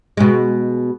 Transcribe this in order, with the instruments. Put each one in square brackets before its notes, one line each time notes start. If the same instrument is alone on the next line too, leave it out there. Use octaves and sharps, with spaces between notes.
[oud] B2 G#3